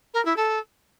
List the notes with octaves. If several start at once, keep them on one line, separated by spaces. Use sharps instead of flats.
A#4
E4
A4